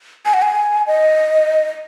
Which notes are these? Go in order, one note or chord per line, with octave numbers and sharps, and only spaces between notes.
G#5
F#5
G#5
D#5